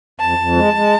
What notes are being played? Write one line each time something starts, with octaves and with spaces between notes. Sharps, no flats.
F2 A5
F2
G#3
G#3